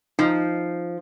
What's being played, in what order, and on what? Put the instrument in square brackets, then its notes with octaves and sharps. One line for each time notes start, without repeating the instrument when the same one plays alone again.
[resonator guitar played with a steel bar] F3 [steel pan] D#4